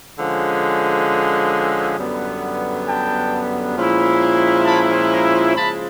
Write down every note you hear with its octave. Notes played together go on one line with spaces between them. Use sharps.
D3 F3 G#3 C#4
F#2 D3 G3 B3
G5 A5
A#2 F3 G#3 C#4 E4
A5 B5
A#5 C6
C#3 F3 G#3 A5 B5